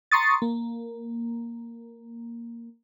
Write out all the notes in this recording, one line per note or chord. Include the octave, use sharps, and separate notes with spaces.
A#5 C6 C#6 D#6 A6
A#3